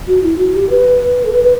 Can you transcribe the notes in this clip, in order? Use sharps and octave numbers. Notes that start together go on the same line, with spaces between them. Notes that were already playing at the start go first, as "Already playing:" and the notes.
F#4
E4
F#4
G4
B4
A4
B4
B4